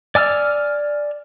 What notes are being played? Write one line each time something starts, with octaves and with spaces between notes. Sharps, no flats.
D5 G#5 E6 F6